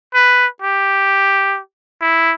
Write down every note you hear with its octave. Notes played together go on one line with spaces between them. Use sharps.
B4
G4
E4